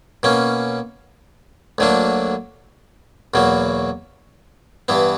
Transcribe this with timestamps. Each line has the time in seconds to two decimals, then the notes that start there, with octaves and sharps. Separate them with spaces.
0.23 B2 A#3 C#4
1.78 D2 D3 F#3 A#3 D4
3.34 E2 B2 F#3 A#3
4.88 G2 E3 B3